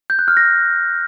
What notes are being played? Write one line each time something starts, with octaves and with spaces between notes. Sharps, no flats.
G6
F#6
F6
A#6